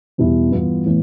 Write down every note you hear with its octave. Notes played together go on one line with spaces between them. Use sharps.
E2 B2 G3 B3 E4
G2 E3 B3 F4
A2 E3 B3